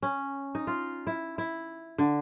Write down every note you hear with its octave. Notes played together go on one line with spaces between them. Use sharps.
C#4
D#4
F4
E4
E4
D3